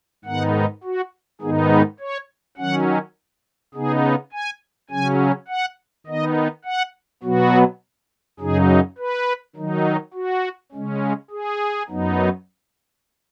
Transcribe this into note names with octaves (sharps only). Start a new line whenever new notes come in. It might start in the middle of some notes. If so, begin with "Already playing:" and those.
G#2 D#3 B3 D#4 F#5
F#4
G#2 D#3 B3 D#4 G#4
B4
C#5
D#3 F#3 C#4 F#5
C#3 B3 D#4 G#4
G#5
C#3 F#3 C#4 G#5
F#5
D#3 B3 D#4 D#5
F#5
B2 F#3 B3 F#4
F#2 C#3 F#3 D#4 G#4
B4
D#3 F#3 D#4
F#4
C#3 G#3 C#4
G#4
F#2 F#3 B3 D#4